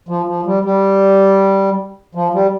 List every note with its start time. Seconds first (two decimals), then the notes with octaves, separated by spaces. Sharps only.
0.09 F3
0.28 F3
0.46 G3
0.65 G3
2.15 F3
2.34 G3